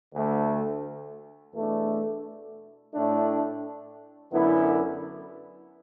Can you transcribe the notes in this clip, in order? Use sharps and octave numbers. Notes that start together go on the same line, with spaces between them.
D2 D3 A3
E2 B2 A3 D4
A2 A3 D4
F#2 D3 B3 E4